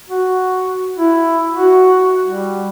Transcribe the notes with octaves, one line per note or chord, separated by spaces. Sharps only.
F#4
E4
F#4
G3